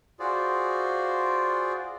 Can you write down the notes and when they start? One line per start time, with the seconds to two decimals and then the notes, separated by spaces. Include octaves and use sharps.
0.19 F4 F#4 G#4 C5 D5